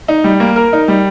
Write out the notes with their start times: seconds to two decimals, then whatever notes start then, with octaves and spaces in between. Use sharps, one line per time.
0.08 D#4
0.24 G3
0.40 A#3
0.56 A#4
0.73 D#4
0.88 G3